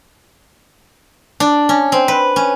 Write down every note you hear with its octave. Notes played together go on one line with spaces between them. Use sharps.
D4
C#4
C4
B4
C#4